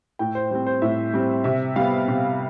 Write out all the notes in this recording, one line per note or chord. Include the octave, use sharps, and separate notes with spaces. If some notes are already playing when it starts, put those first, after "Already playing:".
A2 G5
C5
G3 C4 C5
C5
A2 E5
G3 C4
C3 E5
G3 B3 F5
C3